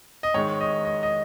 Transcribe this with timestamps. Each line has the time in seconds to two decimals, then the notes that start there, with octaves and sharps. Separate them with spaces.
0.23 D#5
0.34 G#2 D#3 G#3 C#5
0.61 D#5
0.85 D#5
1.03 D#5